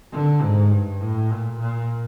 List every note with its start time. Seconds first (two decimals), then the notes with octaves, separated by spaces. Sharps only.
0.13 D3
0.42 G#2
0.71 G2
1.01 A2
1.30 A#2
1.59 A#2